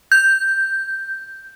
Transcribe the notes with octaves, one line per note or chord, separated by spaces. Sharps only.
G6